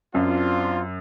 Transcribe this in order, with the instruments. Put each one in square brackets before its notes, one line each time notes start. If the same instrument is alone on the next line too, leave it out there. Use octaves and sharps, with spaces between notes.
[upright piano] F#2 [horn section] C4 D4 F4